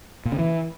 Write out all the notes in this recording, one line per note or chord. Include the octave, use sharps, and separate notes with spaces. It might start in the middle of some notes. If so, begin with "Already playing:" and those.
A#2
C#3
E3